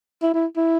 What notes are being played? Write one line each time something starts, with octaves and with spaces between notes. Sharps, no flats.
E4
E4
E4